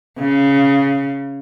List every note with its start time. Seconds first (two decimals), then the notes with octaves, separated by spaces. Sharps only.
0.19 C#3